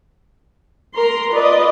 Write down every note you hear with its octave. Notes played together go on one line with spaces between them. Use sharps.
A#4 A#5 C6
F4 B4 D5 D#5